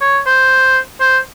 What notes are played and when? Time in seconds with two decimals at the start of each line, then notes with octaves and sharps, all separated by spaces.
0.01 C#5
0.26 C5
1.00 C5